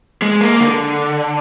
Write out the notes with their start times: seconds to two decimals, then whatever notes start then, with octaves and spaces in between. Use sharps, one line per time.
0.22 G#3
0.41 A#3
0.60 D3